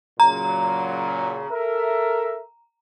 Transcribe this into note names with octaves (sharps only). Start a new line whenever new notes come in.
A#2 C#3 F#3 A#5
A4 A#4 E5